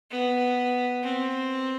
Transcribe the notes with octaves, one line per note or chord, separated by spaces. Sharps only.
B3
C4